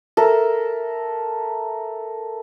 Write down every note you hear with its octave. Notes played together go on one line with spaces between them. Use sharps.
A4 A#4 E5